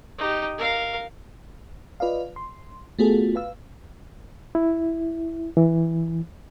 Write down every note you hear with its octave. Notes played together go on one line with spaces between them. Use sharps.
D#4 G4
A#4 F5
F4 B4 D5 D#5 F5
C6
A3 B3 F4 F#4 G#4 A4
B4 F5 E6
E4
E3